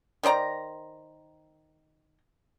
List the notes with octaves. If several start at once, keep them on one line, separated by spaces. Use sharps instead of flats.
D#3 C5 D5 A#5